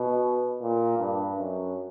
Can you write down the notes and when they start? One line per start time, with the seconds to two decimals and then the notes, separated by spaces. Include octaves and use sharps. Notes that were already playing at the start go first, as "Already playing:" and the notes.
Already playing: B2
0.62 A#2
0.99 G2
1.39 F#2